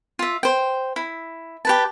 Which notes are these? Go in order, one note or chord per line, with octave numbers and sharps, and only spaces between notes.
F4 E5
C5 G5
E4
G4 B4 A5